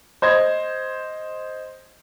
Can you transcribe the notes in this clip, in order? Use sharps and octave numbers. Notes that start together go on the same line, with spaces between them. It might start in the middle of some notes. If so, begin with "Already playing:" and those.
C5 D#5 G#6